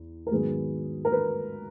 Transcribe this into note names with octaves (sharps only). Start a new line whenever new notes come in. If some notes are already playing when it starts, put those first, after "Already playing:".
Already playing: E2
A#4
G#2 D#3 F#3 B3 G#4
A#4
B4